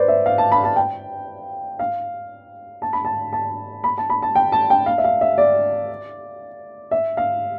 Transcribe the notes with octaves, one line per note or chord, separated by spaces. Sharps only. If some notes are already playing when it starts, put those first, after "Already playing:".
Already playing: B4 C5 D5
E5
F5
A5
B5
A5
G5
F5
A5
B5
A5
A5
B5
A5
B5
A5
G5
A5
G5
F5
E5
F5
E5
D5
E5
F5